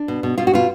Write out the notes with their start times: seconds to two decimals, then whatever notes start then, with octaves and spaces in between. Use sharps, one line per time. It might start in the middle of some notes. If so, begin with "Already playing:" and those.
Already playing: D4
0.08 B2
0.23 B2
0.38 B2 F4
0.47 F#4
0.54 B2 F4